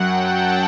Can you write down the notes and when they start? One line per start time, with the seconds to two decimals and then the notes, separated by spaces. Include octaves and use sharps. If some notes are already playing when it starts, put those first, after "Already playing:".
Already playing: F#2 F#3 F#5 G5
0.21 A5